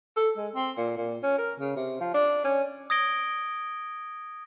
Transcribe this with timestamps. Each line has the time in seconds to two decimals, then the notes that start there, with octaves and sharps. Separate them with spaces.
0.17 A4
0.37 G#3
0.55 C4
0.77 A#2
0.97 A#2
1.23 C#4
1.38 A#4
1.59 C#3
1.76 C3
2.01 F3
2.14 D4
2.44 C#4
2.90 D#6 G#6 A#6 D7 G7